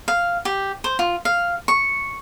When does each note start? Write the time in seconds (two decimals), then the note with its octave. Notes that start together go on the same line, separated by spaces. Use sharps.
0.08 F5
0.45 G4
0.84 C5
0.99 F4
1.25 F5
1.68 C#6